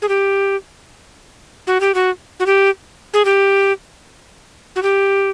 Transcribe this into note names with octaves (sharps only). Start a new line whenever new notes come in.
G#4
G4
F#4
G4
F#4
F#4
G4
G#4
G4
F#4
G4